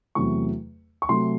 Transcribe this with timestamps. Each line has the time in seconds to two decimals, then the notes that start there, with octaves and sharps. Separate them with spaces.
0.15 E2 C3 F#3 A3 C#6
1.02 C#6
1.09 C3 F#3 A3 C6